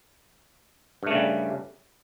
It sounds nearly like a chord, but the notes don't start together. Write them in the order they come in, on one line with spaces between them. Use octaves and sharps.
G2 A3 C#3 G3